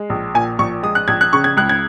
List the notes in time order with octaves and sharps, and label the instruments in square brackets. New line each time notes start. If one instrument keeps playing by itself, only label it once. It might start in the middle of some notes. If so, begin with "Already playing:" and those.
Already playing: [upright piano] G#3
A#1
A#2 G#5
A#1 C#6
G#3 D#6
F#6
A#1 G#6
F#6
C#3 C#6
G#6
C#2 F#6
G#6